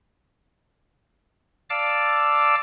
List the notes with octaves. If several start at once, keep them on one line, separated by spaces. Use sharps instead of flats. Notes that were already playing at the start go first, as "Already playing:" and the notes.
D5 F5 A5 D6 E6